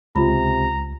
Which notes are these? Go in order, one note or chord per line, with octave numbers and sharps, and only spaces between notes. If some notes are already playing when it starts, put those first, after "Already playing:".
C#2 C3 F4 A#5 B5